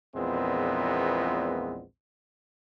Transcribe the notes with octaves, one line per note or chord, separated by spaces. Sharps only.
A#1 E2 A#2 G#3 B3 C4